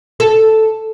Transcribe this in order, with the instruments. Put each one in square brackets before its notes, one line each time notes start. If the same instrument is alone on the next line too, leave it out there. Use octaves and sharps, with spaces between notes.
[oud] A4